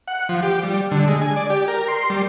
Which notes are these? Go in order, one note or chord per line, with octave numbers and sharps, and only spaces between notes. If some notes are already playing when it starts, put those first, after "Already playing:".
F#5
F3
G4
G3
D3
G#3
G#5
D5
G4
A#4
C6
G3